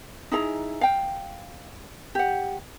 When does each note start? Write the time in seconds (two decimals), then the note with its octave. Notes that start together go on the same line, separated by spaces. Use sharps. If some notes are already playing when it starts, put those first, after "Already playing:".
0.32 D#4 E4 G#4 A#5
0.81 F5 G5
2.15 G4 F#5